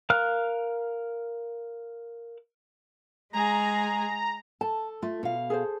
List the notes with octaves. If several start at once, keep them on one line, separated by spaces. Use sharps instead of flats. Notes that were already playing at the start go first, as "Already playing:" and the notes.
A#4 F5 F6 F#6
G#3 G#4 A#5
A4 A5
A3 F4
B2 F5
G#4 A4 C5